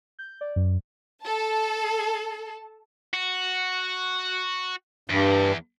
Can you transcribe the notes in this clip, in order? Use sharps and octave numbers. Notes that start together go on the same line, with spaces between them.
G6
D5
F#2
A4 A5
F#4
E2 G2